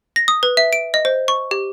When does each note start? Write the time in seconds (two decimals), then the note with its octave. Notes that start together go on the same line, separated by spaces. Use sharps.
0.16 A#6
0.28 D#6
0.43 B4
0.57 E5
0.73 D7
0.94 D#5
1.05 C5
1.28 C#6
1.51 G4